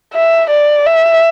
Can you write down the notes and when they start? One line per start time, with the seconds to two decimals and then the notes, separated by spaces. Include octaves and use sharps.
0.14 E5
0.50 D5
0.86 E5